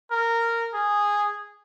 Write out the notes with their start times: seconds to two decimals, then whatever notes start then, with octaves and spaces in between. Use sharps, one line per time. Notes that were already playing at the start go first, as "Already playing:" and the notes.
0.12 A#4
0.74 G#4